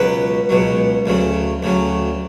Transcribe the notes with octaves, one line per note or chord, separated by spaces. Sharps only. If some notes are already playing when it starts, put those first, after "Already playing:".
Already playing: C#2 B2 F#3 B4
C#2 B2 F#3
D2 C#3 F#3
D2 C#3 F#3